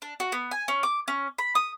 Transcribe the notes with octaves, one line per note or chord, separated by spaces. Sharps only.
D4
F#4
B3
G#5
C#4
D6
C#4
B5
D#6